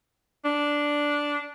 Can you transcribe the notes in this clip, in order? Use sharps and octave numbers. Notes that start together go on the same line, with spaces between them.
D4